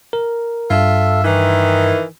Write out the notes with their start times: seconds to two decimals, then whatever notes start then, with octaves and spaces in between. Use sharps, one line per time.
0.13 A#4
0.70 G2 F4 A4 E5
1.24 D#3 E3